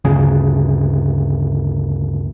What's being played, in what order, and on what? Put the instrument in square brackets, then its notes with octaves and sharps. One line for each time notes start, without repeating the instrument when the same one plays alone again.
[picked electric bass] G1 D2 C#3